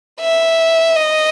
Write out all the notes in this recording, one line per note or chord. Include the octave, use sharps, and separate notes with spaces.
E5
D#5